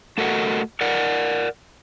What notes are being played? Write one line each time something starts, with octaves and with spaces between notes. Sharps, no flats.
A3 F#4 A4 A#4 D#5 F#5
A#4 D5 F#5